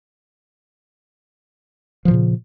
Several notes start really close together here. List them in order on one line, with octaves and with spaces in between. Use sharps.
F3 E3 A#2 C#3